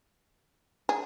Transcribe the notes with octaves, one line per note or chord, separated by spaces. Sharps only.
G#4